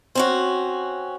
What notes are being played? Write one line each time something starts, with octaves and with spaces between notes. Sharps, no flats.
C4 C#4 F#4